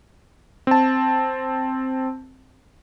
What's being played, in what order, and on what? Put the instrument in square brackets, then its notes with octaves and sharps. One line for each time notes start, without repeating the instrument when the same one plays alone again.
[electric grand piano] C4 A5